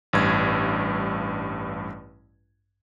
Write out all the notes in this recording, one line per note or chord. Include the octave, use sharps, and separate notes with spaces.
A1 G2 G#6